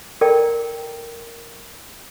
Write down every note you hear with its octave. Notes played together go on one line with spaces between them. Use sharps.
A4 A#4 D5 G5 A#5